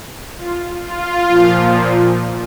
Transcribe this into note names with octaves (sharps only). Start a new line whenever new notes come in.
F4
F4
A#2 F3